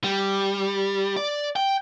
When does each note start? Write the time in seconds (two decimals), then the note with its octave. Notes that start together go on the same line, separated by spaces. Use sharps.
0.04 G3
1.16 D5
1.56 G5